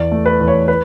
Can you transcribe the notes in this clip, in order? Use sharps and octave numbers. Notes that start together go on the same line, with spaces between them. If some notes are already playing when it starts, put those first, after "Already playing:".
Already playing: E2 D5
A3
B4
E2
C#5
B4